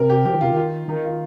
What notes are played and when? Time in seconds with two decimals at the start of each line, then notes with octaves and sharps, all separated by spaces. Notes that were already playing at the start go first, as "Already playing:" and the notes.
Already playing: C3 A#4
0.10 G4
0.25 F3 G4
0.34 D#3
0.41 C3 F4
0.51 D#3
0.56 F4
0.88 D#3 D#4
1.04 F4